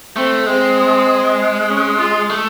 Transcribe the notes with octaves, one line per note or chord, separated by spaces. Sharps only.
A3 C4
G#3 C4
C#4
F4
A3